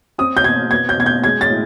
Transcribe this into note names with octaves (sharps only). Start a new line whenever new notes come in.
C4 D#6
G6
B2 G#6
B3 G#6
G6
B2 G#6
G6
G#3 G#6
A6
A2